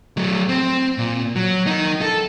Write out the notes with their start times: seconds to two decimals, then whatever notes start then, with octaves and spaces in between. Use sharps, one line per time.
0.17 F#3 A3
0.49 C4
0.98 A#2
1.36 F#3
1.66 D#4 A#4
2.02 A4